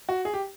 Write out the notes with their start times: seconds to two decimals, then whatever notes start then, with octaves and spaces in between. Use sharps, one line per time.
0.09 F#4
0.25 G#4
0.34 G4